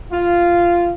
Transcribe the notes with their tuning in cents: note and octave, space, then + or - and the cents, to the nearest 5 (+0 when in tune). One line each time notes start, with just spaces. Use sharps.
F4 -10